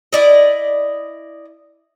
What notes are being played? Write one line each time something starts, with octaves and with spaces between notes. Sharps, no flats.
E4 D5 D#5